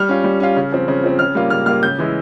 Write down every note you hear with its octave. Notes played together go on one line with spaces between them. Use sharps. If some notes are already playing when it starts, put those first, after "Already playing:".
Already playing: G3 F6
C#4 F4
G3
C#4 F4
C#3
F3 C4
C#3
F3 C4
C#3 F6
G3 A#3 F4
C#3 F6
G3 A#3 F4 F6
C#3 G6
E3 G#3 E4